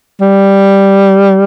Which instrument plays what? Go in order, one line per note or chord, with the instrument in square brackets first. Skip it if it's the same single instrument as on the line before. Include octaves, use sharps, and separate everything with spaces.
[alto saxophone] G3